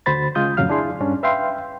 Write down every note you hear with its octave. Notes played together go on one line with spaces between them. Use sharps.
D2 D3 F#4 C5 B5 A6
C#3 G#3 F4 D#6 G6
F2 A2 C#3 F#3 F5 F6
D4 E4 G#4 C6
G2 C#4 D4
B4 E5 F5 G5 C6